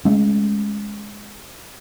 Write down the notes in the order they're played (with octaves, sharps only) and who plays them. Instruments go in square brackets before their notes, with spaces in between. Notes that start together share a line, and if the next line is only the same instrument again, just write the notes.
[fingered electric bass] G#3 A3 C#4